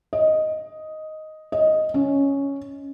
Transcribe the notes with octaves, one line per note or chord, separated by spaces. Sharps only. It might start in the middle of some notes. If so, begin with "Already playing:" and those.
D#5
D#5
C#4